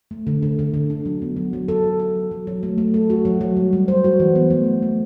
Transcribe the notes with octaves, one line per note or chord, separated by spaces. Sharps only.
A3
D3
D3
D3
D3
D4
F#3
B3
F#3
F#3
A4
F#4
A4
F#3
F#3
F#3
A3
A3
A4
F#4
F#3
F#3
G3
G3
C5
F#4
E3
B3
A3
A3
A3